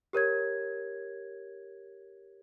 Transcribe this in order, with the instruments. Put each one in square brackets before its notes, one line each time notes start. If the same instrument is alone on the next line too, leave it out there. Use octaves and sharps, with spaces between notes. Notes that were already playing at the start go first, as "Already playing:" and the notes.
[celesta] G4 A#4 C#5 G#6